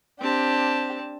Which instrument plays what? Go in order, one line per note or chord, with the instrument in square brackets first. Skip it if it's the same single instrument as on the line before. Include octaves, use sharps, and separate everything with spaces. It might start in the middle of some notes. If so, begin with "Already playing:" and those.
[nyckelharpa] C4 A5 [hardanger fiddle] D4 G4